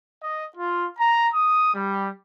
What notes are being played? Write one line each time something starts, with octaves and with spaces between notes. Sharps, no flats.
D#5
F4
A#5
D#6
G3